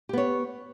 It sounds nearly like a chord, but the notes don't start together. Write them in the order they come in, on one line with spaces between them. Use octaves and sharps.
G4 B3 C#5